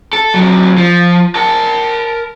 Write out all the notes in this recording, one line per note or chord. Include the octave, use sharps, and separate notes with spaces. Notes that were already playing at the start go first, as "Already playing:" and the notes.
A4
E2 F#3
F3
A#4 A5